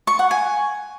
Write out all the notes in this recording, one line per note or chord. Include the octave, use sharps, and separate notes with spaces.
C#6
F#5
G#5